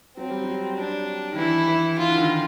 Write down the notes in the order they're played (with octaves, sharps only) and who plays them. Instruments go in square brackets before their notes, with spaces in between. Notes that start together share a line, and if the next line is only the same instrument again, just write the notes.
[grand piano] F#3 [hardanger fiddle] C4
[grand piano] G3
F#3
[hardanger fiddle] D4
[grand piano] D#3
[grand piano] E3 [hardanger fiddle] E4
[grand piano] E3
[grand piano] E3 [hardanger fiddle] F4
[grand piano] D3
D#3